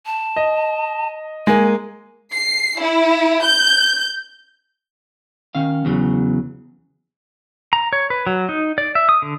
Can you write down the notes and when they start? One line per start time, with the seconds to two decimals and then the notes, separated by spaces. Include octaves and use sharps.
0.06 A5
0.36 D#5
1.47 G#3 A#3 G#5
2.33 C7
2.81 E4
3.44 G6
5.55 D#3 C#4 F5
5.85 E2 C#3 F#3
7.73 A#5
7.93 C#5
8.10 B4
8.27 F#3
8.49 D#4
8.78 D5
8.95 E5
9.09 D#6
9.22 D3